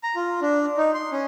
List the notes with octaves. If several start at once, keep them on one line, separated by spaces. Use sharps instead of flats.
A#5
F4
D4
D#4
C6
C#4